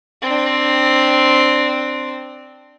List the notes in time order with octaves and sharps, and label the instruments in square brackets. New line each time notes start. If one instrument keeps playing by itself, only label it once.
[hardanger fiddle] C4 D4